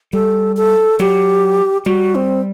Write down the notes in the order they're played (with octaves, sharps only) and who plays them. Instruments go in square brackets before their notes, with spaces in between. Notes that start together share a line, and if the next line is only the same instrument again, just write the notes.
[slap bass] G3 [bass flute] A4
[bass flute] A4
[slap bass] F#3 [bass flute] G4
[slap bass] G3 [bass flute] F#4
[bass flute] C4